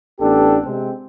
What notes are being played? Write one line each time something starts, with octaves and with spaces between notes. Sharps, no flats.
A1 B3 D4 G4 A4
C3 G#3 C4